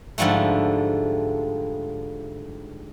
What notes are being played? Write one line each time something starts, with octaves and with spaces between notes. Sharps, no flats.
G#2 D3 F3 G3 A3